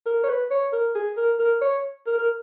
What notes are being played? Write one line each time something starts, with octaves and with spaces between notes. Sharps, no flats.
A#4
C#5
B4
C#5
A#4
G#4
A#4
A#4
C#5
A#4
A#4